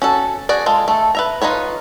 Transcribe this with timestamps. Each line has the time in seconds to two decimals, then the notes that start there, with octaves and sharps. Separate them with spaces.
0.02 C#4 F#4 A4
0.49 F#4 G#4 D5
0.66 G#3 F4 A4
0.88 A3 A4
1.15 B4 E5 A#5
1.42 D#4 F4 B4 C#5